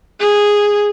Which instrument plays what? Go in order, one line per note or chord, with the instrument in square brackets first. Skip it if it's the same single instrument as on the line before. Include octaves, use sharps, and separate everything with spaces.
[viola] G#4